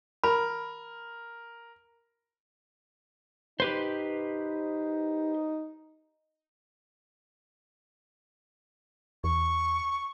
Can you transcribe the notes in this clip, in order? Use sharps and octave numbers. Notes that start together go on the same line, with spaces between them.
A#4 B5
D#4 G4 B4 C5
E2 C#6